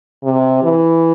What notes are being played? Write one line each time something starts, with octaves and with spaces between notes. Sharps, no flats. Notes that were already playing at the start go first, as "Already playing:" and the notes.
C3
E3